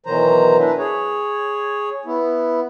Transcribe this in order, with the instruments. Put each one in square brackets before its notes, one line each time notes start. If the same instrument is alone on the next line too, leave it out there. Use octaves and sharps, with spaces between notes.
[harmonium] B2 D#3 E3 F#3 C5 A#5
D4 E4 B4
G#4 C#5
B3 E4